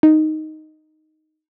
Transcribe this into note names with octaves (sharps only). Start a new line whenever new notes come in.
D#4